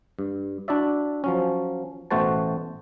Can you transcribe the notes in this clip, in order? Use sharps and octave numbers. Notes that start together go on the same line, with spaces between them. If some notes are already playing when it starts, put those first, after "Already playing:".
G2
D4 E4 F#4 D5 E5
F3 F#3 C#4
A1 B2 A3 F#4 C5 A5